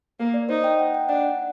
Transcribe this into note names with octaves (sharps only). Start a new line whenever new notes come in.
A#3 A#4
D5
D#4 C5
G5
F#5
G5
D4 F#5